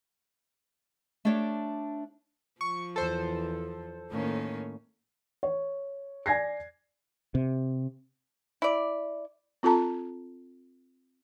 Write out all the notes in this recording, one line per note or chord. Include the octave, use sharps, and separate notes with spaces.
A3 D4 G4 C#5 D5
F3 C#6
E2 E3 A4 C5
A2 D#3 A#3 C#4
C#5
D5 G#5 G#6 A#6 C7
C3
E4 D5
C4 F4 A4 A5 A#5